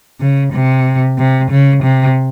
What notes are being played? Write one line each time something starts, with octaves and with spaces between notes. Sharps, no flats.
C#3
C3
C3
C#3
C3